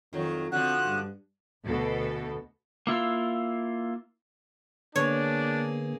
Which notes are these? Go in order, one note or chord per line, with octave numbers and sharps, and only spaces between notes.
F2 D#3 F#3
D3 F3 C4 F#4 F#6
G2
D2 B2 A4
A#3 E4 F4 E6
D3 A#3 B3 D4 G#4 C#5